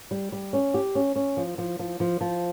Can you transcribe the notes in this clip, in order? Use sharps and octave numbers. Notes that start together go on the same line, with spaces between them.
G3
G3
C#4
G4
C#4
C#4
F3
F3
F3
F3
F3